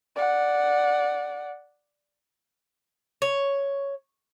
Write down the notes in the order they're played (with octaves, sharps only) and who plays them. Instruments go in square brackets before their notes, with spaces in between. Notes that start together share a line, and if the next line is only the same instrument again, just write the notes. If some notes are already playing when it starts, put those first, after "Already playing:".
[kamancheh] D5 F#5
[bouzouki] C#5